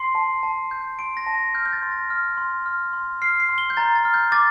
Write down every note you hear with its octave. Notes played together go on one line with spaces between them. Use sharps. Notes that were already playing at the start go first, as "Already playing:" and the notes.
Already playing: C6 C7
A5
A5
G6
C6 D7
A#6
A5
A#6
F6 G6
G6
A6
C6
A#6
F6
C6
F6
C6
F6 C7
C7
C6
G7
G6
A#5 A6
A6
F6
G6
D6 A6